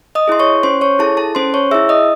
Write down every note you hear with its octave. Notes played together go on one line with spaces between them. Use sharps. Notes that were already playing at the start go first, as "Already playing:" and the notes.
D#5 D#6
E4 G#4 C6
C#5 C#6
C#4 C5 C6
C#5 C#6
E4 G#4 A4 A5
A4 A5
C#4 C5 C6
C#5 C#6
E4 G#4 E5 E6
D#5 D#6